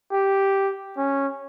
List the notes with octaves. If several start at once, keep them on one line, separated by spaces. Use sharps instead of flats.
G4
C#4